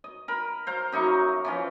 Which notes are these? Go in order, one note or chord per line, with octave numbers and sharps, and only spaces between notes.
D#5
A#4 B5
C5 F5 A#5
F#2 D#4 E4 C#6
E3 F3 C#4